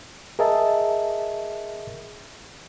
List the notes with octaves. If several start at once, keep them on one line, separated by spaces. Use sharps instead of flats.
G#4 A#4 D#5 E5 A5